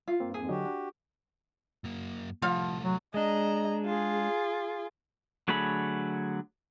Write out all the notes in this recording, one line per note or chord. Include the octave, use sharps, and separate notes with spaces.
F4
G2 A#3 C4
F2 G#2 G#4
D3 F#3 F#4 G4 D#5
D4
F#2 A#3
C2 F3 A3 F5
F#3
G#3 D4 D#5 A#5
F4 G#4
D3 F#3 A3 G#4 B5